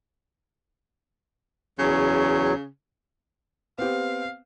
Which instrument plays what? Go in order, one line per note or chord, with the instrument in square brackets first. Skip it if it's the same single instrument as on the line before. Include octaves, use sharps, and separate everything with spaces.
[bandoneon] E2 F#3 [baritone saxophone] C#3
[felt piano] B3 C4 G4 [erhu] F5